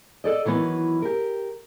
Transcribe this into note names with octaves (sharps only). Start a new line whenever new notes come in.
A4 D5 D#5
D#3 E3 F#3 B3
G4 A#4